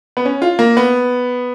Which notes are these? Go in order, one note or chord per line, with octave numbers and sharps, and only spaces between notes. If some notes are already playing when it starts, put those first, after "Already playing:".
B3
C#4
F4
A#3
B3